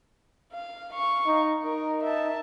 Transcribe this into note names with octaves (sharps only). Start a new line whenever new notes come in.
F5
F5 C#6
D#4
D#4 A#4
E5 A5